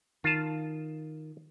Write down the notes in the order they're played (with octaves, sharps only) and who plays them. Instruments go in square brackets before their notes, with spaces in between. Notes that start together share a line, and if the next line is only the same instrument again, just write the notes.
[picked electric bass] D#3 [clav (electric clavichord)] F4 A5